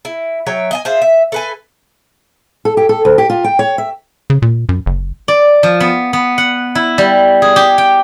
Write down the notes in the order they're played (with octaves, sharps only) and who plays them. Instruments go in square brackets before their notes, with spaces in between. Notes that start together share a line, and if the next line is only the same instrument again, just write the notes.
[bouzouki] E4
F#3 C#5 E5 G5
D#5 E5 G#5
F4 G#4 C5 E5
E5
A4 B4 G#5
[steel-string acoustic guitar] A4
G4
A4
D2
G4
F4
G5
C#5
E5
[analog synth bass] C#3
A#2
F#2
F#1
[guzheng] D5
F3
B3
B3
F#5
E4
G3
G#4
G4
G5